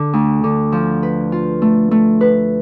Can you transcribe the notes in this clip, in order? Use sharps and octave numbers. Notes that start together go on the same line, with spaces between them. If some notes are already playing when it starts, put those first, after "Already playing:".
Already playing: D3
D2
D3
F3
B4
F4
A3
A3
B4